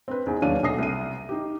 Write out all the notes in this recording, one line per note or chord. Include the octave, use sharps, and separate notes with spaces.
C4 B4
E2 D#4
D#2 F#3 C#4 D4 F5 D#7
B1 B2 A4 D#6 A#6 C7
C2 D#7
D#4 G4